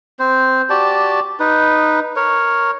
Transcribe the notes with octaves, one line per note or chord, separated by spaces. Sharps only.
C4 C5
F#4 G4 D5 A5
D#4 B4
A#4 C#5